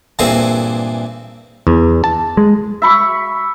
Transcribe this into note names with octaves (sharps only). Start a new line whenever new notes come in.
G2 A#2 E3 C4 G#4 C5
E2
A5
G#3
E5 B5 C#6